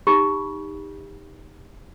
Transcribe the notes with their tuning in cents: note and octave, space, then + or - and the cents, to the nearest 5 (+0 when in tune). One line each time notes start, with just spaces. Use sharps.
D#4 +0 G4 +25 B5 -25